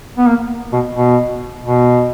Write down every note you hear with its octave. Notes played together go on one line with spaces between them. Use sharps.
B3
A#3
B2
B2
B2